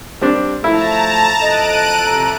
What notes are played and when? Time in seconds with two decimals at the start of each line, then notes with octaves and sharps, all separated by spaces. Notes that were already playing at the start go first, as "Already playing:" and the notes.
0.21 G3 C4 D4
0.64 F3 A3 E4 A5 A#5
1.41 F2 A4 D#5 F#6 D7 D#7
2.06 C3 A#5